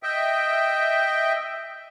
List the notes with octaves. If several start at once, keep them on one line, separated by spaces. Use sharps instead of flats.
D#5 E5 G5